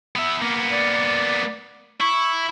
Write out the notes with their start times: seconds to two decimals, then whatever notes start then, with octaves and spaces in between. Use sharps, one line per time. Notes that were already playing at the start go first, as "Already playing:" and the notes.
0.15 B3 E5
0.42 A#3 B3
0.72 D5
2.00 E4 C#6